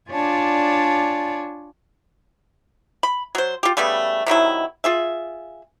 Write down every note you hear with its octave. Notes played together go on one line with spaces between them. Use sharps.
D4 F4 C#5 D5 G#5 A5
B5
F#3 C5
F4 G4
C#3 G3 A3 B3
C3 D#3 F#3 E4
F4 G#4 E5